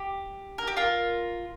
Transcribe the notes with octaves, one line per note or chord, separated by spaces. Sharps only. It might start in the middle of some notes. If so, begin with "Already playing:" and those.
Already playing: G4
A#4
G4
F4 A#4